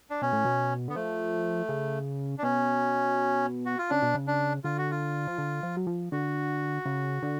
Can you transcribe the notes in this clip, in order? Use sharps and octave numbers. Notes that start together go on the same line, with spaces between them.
D4
B2 C#4
A2
B2
D3 B3
F3 A3
C#3
D4
B2 C#4
F#4
F4
C#3 D4
B2
C#3
D4
D3 F4
F#4
F4
F3
D3
F3
F#3
F3
D3 F#4
C#3
D3